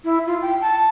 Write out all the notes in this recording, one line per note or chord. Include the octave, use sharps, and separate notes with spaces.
E4
F4
G5
A5